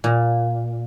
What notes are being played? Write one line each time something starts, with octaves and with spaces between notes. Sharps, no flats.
A#2